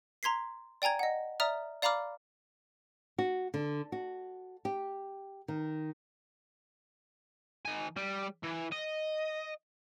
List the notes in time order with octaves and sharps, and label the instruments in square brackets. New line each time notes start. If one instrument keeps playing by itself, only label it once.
[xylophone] A#5 C6 G#6 B6 C7
D5 G5 G#5 A#5 G#6
D#5 F#5
D5 E5 A#5 D#6 F6
D5 F5 A#5 B5 D6 F6
[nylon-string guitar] F#4
D3
F#4
G4
D#3
[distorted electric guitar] D#3 G#5
G3
E3
D#5